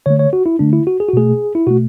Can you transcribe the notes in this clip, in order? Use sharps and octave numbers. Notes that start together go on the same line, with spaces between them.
D3 A3 C#5
C#5
F#4
E4
D3 A3 D4
E4
F#4
G#4
F#4
B2 A3 G#4
E4
B2 A3 F#4